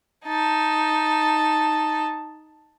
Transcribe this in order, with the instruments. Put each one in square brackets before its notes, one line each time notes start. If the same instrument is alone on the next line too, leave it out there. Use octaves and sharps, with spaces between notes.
[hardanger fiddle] D#4 A5